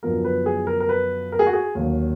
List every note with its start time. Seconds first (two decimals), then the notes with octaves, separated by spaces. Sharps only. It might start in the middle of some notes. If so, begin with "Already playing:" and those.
0.03 F#2 D3 F3 B3 A#4
0.24 B4
0.46 G#4
0.67 A#4
0.80 A#4
0.89 B4
1.32 A#4
1.39 G#4
1.47 F#4
1.53 G#4
1.75 D#2 D3 F#3 A#3